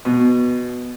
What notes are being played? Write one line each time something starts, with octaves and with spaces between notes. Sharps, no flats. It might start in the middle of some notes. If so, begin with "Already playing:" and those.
B2